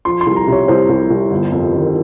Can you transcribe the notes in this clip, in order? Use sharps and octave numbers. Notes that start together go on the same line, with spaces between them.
F3 C6
C6
C2
A#5
C3 C#5
C2 C5
C2
C2
G1
F2
D#3